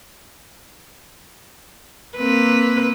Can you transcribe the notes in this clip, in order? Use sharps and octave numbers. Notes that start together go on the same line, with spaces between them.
A#3 C4 B4